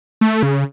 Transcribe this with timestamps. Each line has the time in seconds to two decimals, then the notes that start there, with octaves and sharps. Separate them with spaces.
0.21 A3
0.43 C#3